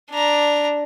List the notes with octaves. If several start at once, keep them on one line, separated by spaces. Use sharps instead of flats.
D4 A#5